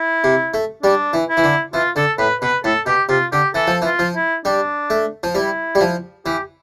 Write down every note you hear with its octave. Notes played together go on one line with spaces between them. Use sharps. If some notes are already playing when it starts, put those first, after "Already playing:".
Already playing: E4
C3
A3
G3 D4
E3
E4
E3
D3
E3 F4
D3 A4
A2 B4
B2 B4
A2 A4
B2 G4
C3 F4
D3 G4
E3 A4
F3
E3
F4
F3
E4
G3 D4
A3
F3
G3 E4
G3
F3
E3 G4